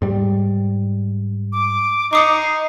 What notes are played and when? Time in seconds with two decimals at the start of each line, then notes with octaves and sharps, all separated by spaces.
0.02 G#2 G3
1.53 D6
2.13 D#4 D6 D#6 C7 C#7